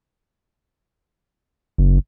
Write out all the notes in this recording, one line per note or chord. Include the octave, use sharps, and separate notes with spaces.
F#1